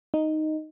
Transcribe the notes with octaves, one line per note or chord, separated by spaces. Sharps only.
D#4